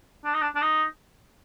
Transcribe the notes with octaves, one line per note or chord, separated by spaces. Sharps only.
D4
D#4
D4
D4
D#4